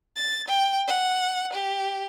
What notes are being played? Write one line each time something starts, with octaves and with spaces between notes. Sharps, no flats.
A6
G5
F#5
G4